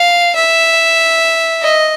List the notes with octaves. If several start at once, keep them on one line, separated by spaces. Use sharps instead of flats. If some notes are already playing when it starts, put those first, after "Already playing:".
Already playing: F5
E5
D#5